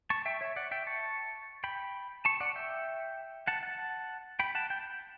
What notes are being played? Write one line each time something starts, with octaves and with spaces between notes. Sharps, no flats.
A5 C#6
E5 G5
C#5 E5
D5 F#5
E5 G5
A5 C#6
G5 B5
A5 C#6
D5 F#5
E5 G5
F#5 A5
F#5 A5
G5 B5
F#5 A5
G5